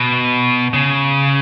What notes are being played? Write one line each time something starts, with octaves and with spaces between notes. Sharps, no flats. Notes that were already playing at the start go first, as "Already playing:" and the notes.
Already playing: B2
C#3